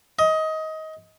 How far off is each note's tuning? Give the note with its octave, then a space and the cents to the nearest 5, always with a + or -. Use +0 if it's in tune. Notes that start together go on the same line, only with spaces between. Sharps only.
D#5 +20